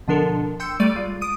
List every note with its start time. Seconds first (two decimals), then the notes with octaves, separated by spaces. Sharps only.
0.08 B2 D3 F3 D4 A4 A#4
0.60 G5 C6 E6 G6 C#7
0.80 G3 A3 D5 A6 D7 D#7
0.96 G#3 F4
1.21 D#6 D7 D#7